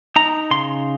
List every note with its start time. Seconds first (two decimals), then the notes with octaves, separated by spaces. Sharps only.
0.16 D#4 A#5
0.51 C#3 C6